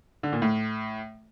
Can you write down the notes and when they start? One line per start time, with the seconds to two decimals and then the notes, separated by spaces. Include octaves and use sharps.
0.23 D3
0.33 A#2
0.42 A2